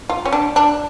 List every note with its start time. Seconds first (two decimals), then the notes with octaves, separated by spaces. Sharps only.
0.09 F4
0.25 C#4
0.33 D4
0.56 D4